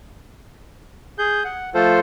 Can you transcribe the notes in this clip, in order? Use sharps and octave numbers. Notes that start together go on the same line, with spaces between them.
G#4 G6
F#5
F3 A3 F4 A4 C5